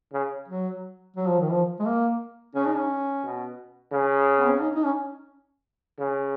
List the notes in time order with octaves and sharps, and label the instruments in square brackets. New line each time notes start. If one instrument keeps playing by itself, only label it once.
[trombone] C#3
[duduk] F#3
F#3
F3
D#3
F3
G#3
A#3
[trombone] C#3 [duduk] C#4
[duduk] D#4
C#4
[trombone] B2
C#3
[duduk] B3
C#4
D#4
D#4
C#4
[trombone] C#3